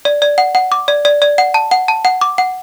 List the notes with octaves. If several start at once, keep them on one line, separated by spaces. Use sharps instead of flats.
D5
D5
F#5
F#5
D6
D5
D5
D5
F#5
A5
F#5
A5
F#5
D6
F#5